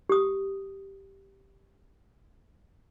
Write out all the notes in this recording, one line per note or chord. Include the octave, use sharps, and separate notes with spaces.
G4 D#6